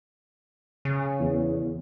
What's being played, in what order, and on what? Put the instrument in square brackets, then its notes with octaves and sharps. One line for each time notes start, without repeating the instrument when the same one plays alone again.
[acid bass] C#3
[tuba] E2